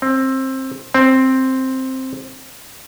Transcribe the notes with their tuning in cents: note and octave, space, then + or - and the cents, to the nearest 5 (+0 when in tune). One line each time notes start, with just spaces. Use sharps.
C4 +20
C4 +5